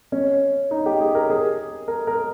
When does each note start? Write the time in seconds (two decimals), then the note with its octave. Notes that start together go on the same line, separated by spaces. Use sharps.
0.12 C#4
0.71 D#4
0.86 G4
1.00 G#4
1.15 A#4
1.30 G#4
1.88 A#4
2.07 A#4